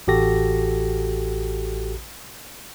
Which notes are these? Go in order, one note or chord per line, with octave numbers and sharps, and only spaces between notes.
A1 F#4 G4 A4 A#6